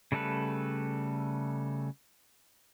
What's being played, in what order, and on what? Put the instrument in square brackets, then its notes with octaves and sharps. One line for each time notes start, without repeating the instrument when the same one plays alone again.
[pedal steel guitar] C#3 G3 A3 A4 B4